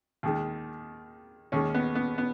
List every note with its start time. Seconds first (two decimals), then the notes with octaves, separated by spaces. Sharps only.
0.23 D#2 D#3 G#3
1.52 D#2 D#3 G#3 C#4
1.74 B3
1.95 B3
2.18 B3